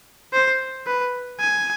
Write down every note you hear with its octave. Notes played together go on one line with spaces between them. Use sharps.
C5
B4
G#5